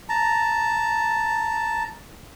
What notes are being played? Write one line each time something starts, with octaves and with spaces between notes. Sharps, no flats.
A5 A#5